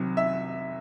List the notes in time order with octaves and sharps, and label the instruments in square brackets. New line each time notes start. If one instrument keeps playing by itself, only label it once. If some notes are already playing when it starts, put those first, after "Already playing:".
Already playing: [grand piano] C2 C3 D#3 F#3
E5